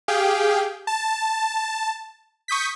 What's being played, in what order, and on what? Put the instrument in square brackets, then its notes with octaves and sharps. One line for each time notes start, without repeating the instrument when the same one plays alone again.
[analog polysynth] G4 G#4 F5 G5
A5
C#6 D#6 G6 B6